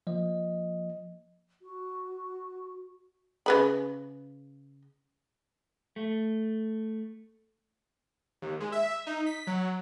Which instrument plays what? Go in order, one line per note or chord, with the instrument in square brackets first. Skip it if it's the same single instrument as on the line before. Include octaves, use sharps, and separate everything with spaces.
[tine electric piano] F3 A#3 D#5
[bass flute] F#4
[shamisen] C#3 B4 B5
[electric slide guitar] A3
[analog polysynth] D#2
G#3
E5
D#4
B6
F#3